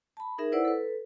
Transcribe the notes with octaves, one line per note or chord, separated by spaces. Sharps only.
A5 B5
D#4 G#4 A#4 E5
E4 B4 C5 D5 F#5 E6
A4 B4